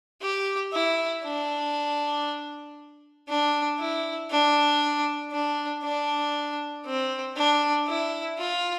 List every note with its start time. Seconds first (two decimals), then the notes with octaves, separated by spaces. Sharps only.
0.22 G4
0.73 E4
1.24 D4
3.28 D4
3.79 E4
4.30 D4
5.32 D4
5.83 D4
6.85 C4
7.36 D4
7.87 E4
8.38 F4